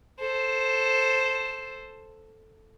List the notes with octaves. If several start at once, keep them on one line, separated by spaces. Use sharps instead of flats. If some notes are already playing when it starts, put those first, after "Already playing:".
A4 C5